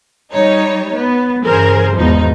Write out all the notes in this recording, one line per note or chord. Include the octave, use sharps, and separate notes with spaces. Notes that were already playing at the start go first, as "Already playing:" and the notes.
G3 D#4 C#5
B3
G2 C#3 E3 G#4 A#4 C5
G#1 E2 B2 F3 D#4